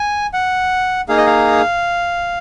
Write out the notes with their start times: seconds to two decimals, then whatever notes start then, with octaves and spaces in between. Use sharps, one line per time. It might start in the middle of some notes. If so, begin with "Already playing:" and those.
Already playing: G#5
0.34 F#5
1.09 A#3 D#4 G#4 F5
1.17 D#5
1.27 F5